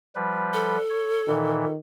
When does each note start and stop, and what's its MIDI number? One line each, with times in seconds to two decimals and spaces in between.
0.15 0.78 53
0.15 0.78 55
0.15 0.78 71
0.53 1.71 69
0.90 1.22 73
1.27 1.65 46
1.27 1.77 51
1.27 1.65 52